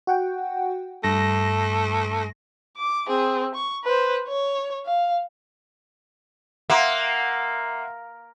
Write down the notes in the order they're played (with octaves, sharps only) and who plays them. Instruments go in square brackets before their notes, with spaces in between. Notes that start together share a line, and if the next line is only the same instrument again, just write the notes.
[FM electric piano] F#4 F#5 G5
[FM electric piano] G2 A#6 [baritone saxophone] A3
[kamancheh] D6
C4 G#4
C#6
B4 C5
C#5
F5
[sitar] A#3 [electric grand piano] E5 F#5 C6